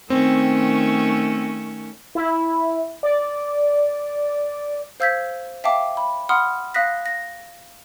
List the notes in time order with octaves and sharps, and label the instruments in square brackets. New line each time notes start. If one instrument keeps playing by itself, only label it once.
[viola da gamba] D#3 A3 C#4 [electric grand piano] C4
[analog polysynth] E4
D5
[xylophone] C5 F5 E6 G6 G#6 B6
E5 F5 G5 A5 D6
B5
F#5 B5 C6 D#6 F6
F5 D#6 F#6 A#6 B6
A#6